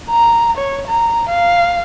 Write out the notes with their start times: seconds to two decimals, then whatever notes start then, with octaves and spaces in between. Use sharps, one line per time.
0.10 A#5
0.57 C#5
0.87 A#5
1.30 F5